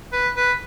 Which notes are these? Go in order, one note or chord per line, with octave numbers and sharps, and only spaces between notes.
B4
B4